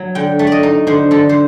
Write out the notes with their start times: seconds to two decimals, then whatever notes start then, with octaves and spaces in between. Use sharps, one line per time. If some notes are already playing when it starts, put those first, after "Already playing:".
Already playing: F#3
0.15 D3 G5
0.39 A3
0.47 D5 D#5
0.63 D#4
0.87 D3 C5
1.11 D3 A4
1.29 C5